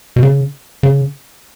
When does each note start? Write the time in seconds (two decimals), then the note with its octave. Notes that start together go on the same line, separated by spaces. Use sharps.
0.16 B2
0.23 C#3
0.83 C#3